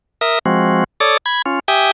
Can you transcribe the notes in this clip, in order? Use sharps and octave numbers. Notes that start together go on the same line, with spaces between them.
A#4 E5 D#6
F3 G#3 C4 F#4
A4 C#5 D5 D6 D#6
B5 G#6
C#4 F4
G4 E5 G5 G#5 D#6